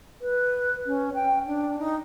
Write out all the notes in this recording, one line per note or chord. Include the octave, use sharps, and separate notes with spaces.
B4
C#4
G5
D4
D#4